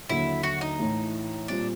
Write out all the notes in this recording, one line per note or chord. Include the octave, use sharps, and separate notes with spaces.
D#2 D3 F#3 E4
F#4
D#4
A2 E3 A3
A#2 G3 C4 D4